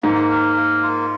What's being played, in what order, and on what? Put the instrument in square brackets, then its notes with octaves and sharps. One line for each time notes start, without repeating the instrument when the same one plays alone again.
[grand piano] G#2 [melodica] A#3
[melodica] A#4
A#3
F4